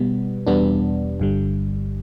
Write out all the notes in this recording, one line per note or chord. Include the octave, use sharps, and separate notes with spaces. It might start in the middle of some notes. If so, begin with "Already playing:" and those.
Already playing: B2 G3 B3
E2 B2 G3 B3 D4
G1 G2 D3 G3